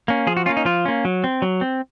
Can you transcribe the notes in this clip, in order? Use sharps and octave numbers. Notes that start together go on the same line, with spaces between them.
A#3 C#4
F3 G#4
F#4
A#3 C#4 F4
D#4
F3 F4
A#3 C#4
F#3
C4
F#3
C4